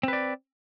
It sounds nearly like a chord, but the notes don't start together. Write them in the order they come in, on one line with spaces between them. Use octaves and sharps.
C4 B4 D5